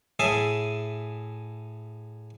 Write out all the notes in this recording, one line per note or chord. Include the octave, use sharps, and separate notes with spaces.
A2 G#4 E5 G#5 A5 D#6